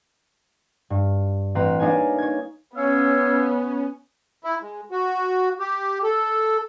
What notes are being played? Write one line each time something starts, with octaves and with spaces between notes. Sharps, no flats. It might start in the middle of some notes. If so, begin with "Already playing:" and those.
G2
A1 C4 B4 A#5
A#3 D4 D#4 C#5 G#5
C#5 G#6
B3 C#4 C#5 F5 E6
E4
G#3
F#4
G4
A4